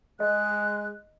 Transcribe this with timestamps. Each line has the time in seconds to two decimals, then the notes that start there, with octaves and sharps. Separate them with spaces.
0.20 G#3 D#5 F#6